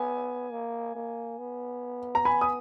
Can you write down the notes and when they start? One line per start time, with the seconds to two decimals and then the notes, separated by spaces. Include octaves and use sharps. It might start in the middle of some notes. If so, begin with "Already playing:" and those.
Already playing: B3 G#5
0.51 A#3
0.95 A#3
1.38 B3
2.15 A#5
2.25 G#5 B5
2.41 D#6